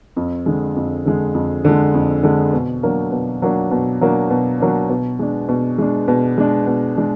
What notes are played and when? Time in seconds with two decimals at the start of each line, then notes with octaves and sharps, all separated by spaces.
0.16 F2
0.46 D3 G#3
0.76 F2
1.05 D3 G#3
1.34 F2
1.65 D3 G#3
1.94 F2
2.23 D3 G#3
2.53 B2
2.83 F#3 A#3 D4
3.12 B2
3.42 F#3 A#3 D4
3.71 B2
4.01 F#3 A#3 D4
4.31 B2
4.60 F#3 A#3 D4
4.90 B2
5.19 G#3 D4
5.49 B2
5.78 G#3 D4
6.08 B2
6.38 G#3 D4
6.67 B2
6.97 G#3 D4